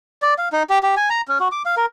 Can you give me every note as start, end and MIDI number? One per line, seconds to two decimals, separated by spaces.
0.22 0.34 74
0.38 0.49 77
0.52 0.63 63
0.70 0.79 67
0.83 0.95 67
0.97 1.09 80
1.10 1.21 82
1.28 1.38 61
1.40 1.48 66
1.52 1.63 86
1.66 1.75 77
1.77 1.86 70